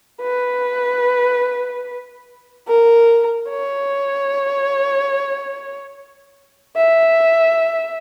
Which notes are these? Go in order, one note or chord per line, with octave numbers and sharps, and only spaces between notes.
B4
A#4
C#5
E5